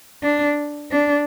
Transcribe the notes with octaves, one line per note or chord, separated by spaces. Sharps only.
D4
D4